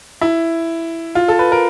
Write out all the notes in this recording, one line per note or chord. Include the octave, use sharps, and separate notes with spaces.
E4
F4
A4
B4
A#4